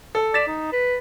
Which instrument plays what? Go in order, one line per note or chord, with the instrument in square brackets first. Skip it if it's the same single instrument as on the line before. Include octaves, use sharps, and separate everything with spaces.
[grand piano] A4
[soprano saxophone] D5 [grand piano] A6 B6 E7
[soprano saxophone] D#4
B4